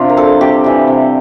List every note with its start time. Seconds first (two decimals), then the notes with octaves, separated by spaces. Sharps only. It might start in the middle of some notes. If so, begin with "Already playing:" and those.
Already playing: C3 C4 D4 F4
0.09 A#4
0.17 G3 A4
0.41 C3 G4
0.64 E3 G3
0.88 C3